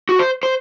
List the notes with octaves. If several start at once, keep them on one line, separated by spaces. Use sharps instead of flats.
F#4
C5
C5